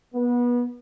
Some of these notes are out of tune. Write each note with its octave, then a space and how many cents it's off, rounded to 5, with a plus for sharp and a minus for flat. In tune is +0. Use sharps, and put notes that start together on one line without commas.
B3 -25